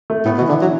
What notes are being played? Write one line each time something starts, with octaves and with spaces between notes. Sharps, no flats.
A3
A2 B3
B2
E3
D3
F#3